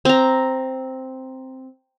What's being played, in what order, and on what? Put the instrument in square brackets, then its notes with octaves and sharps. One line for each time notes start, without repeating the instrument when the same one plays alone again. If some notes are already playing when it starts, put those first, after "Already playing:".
[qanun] C4 A#5